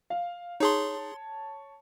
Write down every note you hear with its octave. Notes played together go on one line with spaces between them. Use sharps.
F5
D#4 G#4 C#5 A5 C6